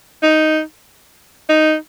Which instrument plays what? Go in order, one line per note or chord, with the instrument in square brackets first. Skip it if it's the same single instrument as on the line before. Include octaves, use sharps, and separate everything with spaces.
[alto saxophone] D#4
D#4